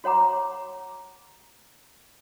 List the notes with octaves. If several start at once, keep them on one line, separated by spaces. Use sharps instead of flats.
F#4 C#5 F#5 A#5 D6